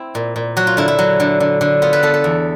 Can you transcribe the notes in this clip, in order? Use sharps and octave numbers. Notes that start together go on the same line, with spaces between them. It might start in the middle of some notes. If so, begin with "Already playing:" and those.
Already playing: C4 E4
A#2
A#2
F#3 F#4
F4
D3 E4
E4
F#3
D3
D3
D3
B3 F4
B4
B3 A4
A4
E2